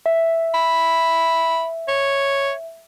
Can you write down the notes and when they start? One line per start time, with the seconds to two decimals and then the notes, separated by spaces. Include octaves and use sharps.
0.06 E5
0.54 B5
1.88 C#5